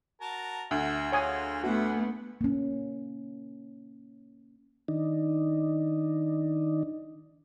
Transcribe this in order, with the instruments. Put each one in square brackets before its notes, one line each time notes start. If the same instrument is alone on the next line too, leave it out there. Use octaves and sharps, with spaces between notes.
[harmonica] F#4 A#4 A5
[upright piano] D2 [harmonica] F#4 E5
[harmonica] F4 F#4 G#4 [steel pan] C#5 G#5 D#6
[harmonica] D3 E5 F#5 [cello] A3 B3 [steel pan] F#4
[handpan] A#3 C#4
[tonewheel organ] D#3 D4 D#4